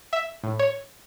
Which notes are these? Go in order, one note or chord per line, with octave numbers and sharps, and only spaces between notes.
E5
A2
C#5